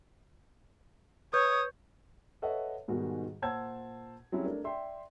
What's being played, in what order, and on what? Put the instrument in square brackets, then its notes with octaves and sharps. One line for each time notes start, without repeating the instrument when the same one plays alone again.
[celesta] B4 G6 [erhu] C#5 [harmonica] D#6
[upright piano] A4 B4 C#5 D#5 E5 F#5
G#2 B2 D#3 G3 F#4
A#2 C5 F#5 A5 E6 G#6
F#3 G3 C4 C#4 E4 G#4
A3 D4 A#4
D5 E5 G5 C6